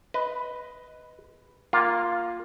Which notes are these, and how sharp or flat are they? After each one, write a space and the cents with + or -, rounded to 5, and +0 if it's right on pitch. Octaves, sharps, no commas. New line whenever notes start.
B4 +0 D#5 +10
A#3 +0 F4 +0